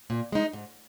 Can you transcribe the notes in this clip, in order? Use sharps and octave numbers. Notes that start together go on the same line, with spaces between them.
A#2
G#3 D#4
G#2